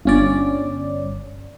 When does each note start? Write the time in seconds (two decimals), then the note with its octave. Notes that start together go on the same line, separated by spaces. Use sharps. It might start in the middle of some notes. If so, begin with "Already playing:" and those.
0.05 G1 C#4 D5